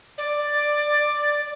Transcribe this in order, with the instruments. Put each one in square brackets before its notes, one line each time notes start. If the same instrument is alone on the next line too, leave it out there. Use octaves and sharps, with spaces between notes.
[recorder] D5